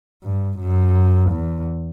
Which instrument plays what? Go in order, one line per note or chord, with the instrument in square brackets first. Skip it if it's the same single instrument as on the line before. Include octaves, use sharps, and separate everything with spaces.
[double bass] G2
F#2
E2